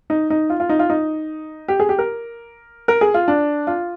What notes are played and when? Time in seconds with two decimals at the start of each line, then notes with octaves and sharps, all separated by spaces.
0.10 D#4
0.30 D#4
0.50 F4
0.60 F4
0.69 D#4
0.79 F4
0.90 D#4
1.68 G4
1.80 G#4
1.89 G4
1.98 A#4
2.88 A#4
3.01 G#4
3.14 F4
3.28 D4
3.67 F4